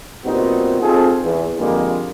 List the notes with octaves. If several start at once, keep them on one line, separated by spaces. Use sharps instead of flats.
A#2 G3 B3 C4 D#4 F#4
C4 D#4 F4 G#4 A4
E2
F2 D3 G3 G#3 A#3